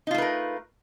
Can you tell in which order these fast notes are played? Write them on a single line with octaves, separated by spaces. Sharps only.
D#4 F4 A3 B4 A#4